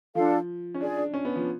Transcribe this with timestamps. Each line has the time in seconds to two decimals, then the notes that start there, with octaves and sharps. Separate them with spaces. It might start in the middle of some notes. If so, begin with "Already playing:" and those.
0.15 F3 D4 F4 A4 F5
0.74 C#4
0.80 D4 F4 G#4 D5
0.97 D4
1.14 C#4
1.25 B3
1.36 F3